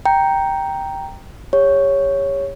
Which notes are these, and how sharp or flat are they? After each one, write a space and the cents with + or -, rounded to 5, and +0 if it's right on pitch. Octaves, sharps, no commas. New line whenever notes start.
G5 +0 A#5 +0
G4 +35 C#5 +0